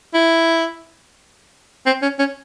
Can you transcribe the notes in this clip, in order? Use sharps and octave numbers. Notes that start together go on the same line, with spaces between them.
E4
C4
C#4
C#4